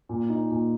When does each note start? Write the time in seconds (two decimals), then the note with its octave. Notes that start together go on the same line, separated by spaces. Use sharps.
0.09 A#2
0.29 D#4
0.51 A#2